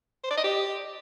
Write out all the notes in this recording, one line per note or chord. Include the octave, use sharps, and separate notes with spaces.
C5
D5
D#5
G4